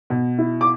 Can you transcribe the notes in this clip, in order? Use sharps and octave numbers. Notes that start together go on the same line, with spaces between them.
B2
E4
D6